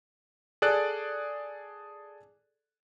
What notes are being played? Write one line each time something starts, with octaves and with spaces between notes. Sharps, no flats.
G#4 A4 D5 F#6